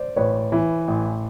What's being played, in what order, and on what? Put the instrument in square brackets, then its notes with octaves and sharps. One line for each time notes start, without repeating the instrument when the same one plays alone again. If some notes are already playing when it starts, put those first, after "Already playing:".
Already playing: [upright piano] C5 D5
[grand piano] A1 [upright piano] B4 C#5
[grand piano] E3
A1